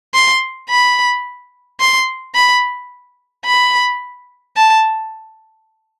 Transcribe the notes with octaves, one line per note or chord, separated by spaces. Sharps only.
C6
B5
C6
B5
B5
A5